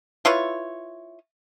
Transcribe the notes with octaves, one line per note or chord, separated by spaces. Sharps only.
E4 F4 B4 C#5